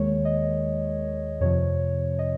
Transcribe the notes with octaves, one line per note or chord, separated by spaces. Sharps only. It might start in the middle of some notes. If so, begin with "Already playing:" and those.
Already playing: D#2 D#3 G#3 C#5
D#5
F2 C3 F3 C#5
D#5